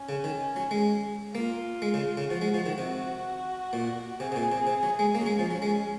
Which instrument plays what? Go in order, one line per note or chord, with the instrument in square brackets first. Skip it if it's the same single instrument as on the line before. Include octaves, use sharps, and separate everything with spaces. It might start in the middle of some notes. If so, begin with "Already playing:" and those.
Already playing: [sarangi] C#4
[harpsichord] C#3
D#3
F#3
G#3
[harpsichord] A#3 [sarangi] F4
[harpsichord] G#3
C#3
C#3
[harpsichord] F3 [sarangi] F#4
[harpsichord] G#3
F3
D#3
C3
A#2
[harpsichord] C3 [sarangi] G#4
[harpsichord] C3
A#2
C3
C3
F#3
G#3
[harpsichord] A#3 [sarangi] C#4
[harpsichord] F#3
G#3
F3
F#3
G#3